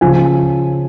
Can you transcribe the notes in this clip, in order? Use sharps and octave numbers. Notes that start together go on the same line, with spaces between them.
C#3 F3 G#5